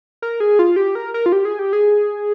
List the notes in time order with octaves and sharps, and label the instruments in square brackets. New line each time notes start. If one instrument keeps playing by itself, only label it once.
[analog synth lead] A#4
G#4
F4
G4
A#4
A#4
F4
G4
G#4
G4
G#4